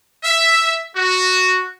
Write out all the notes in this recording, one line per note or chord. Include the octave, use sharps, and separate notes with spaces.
E5
F#4